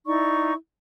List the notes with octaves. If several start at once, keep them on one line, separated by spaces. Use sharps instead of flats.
D#4 E4 D5 C#6